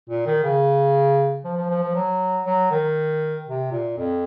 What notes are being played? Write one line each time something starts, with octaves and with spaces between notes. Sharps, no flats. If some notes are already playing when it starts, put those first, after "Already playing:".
A#2
D#3
C#3
F3
F3
F3
F3
F#3
F#3
D#3
C3
A#2
F2